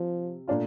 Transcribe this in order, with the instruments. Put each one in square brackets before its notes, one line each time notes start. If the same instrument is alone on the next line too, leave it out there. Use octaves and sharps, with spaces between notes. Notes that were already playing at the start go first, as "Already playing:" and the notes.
Already playing: [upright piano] C3 [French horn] F3
[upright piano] A#2 A3 D4 F4